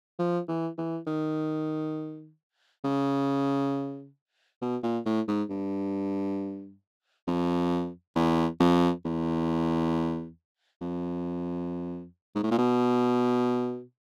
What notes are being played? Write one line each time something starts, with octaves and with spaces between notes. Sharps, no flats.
F3
E3
E3
D#3
C#3
B2
A#2
A2
G#2
G2
F2
E2
F2
E2
F2
G#2
A2
A#2
B2